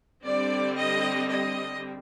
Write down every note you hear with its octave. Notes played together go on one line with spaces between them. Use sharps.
D3 G3 C4 D5
D#5
D#5